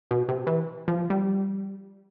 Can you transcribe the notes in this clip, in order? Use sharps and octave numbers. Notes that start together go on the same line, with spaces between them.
B2
C3
E3
F3
G3